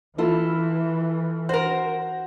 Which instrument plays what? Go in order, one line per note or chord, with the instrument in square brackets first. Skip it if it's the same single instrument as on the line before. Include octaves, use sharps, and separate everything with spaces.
[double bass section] E3 [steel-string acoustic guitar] E4 F4 A4
[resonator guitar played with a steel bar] F#4 A#4 [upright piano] C5